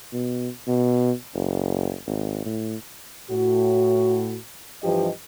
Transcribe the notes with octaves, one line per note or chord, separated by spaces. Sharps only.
B2
B2
F#1
G#1
A2
A2 F#4
G2 E3 F3 G4 D#5